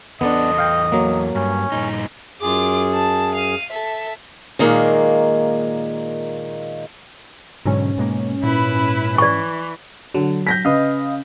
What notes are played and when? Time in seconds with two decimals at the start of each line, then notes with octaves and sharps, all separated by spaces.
0.21 E2 B3 D4 A4 D#5
0.58 F5 G5
0.92 F#3 A#3
1.35 G2 C#4
1.72 G2 A#2 D#4
2.41 F#2 F4 G#4 D6
2.94 A5
3.35 F5 D#7
3.70 A4 E5
4.59 A#2 D#3 G#3 A#3
7.66 G#2 B2 D3 F#3 C#4
7.98 B2 G#3 A#3
8.43 A#2 E4 B4
9.18 E3 D5 C#6
10.14 D3 F#3
10.47 G6 A#6 B6
10.65 C#3 B4 D#5 F5